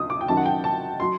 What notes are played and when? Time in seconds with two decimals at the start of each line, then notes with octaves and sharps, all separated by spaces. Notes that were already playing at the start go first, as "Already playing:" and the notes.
Already playing: D2 D3 F#3 D#6
0.10 D6
0.21 G5
0.28 F#2 D#3 F#3 A5
0.37 F#5
0.46 G5
0.64 A5
1.00 F#3 C6